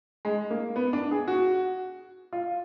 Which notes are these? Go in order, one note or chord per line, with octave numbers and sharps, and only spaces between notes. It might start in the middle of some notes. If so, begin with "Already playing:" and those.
G#3
A#3
B3
D4
G#4
F#4
F4